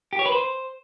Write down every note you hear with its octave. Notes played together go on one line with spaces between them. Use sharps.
G4
C#5
B4
C5